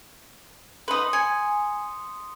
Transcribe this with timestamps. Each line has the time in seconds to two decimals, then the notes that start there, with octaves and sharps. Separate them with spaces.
0.88 D#4 B4 C6 D#6
1.13 G#5 C#7